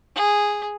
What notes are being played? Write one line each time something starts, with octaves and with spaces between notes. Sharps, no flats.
G#4